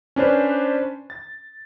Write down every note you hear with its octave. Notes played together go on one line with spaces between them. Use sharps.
C#4 D4 B4 C5
A6